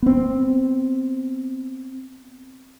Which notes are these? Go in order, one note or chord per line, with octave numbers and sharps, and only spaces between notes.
B3 C4